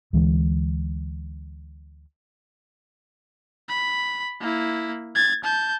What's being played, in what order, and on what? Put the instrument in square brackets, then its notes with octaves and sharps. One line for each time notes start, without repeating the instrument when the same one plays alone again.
[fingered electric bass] D2 E3 G#3
[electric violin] B5
A#3 E4
G#6 A6
A5 G6